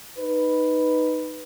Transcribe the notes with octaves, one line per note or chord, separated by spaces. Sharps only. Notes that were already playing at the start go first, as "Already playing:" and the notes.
D#4 B4